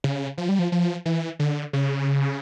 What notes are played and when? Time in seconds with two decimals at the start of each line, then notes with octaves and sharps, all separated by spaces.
0.04 C#3
0.38 F3
0.49 G3
0.59 F3
0.72 F3
1.06 E3
1.39 D3
1.73 C#3